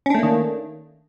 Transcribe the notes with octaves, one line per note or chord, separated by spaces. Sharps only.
D#3 A3 A#3 C#4 D4